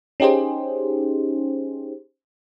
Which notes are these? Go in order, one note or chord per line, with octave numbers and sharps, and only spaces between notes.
C#4 D#4 G4 G#4 C5